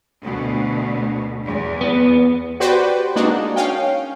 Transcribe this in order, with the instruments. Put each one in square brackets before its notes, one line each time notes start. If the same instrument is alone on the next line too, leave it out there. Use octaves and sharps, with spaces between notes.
[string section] D2 B2
E2
[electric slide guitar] B3
[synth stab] F#4 G4 B4 C5 D5 G5
G#3 A#3 D4 D#4 F#4
C#4 F5 G5